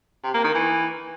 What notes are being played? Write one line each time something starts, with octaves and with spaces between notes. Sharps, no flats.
C3
A#3
D#3
E3